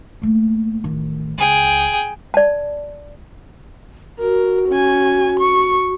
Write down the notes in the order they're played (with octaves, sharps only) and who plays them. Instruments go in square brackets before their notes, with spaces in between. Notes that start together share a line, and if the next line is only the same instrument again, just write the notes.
[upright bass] A3 A#3
A1 D#3
[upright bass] C#2 [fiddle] G#4 G5
[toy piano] D5 A5
[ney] F#4 [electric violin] A#4
[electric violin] C#4 G#5
C#6